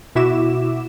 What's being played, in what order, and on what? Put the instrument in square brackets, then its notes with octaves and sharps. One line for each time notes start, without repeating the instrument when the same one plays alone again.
[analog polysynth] B2 E4 F#4 E5 D6 E7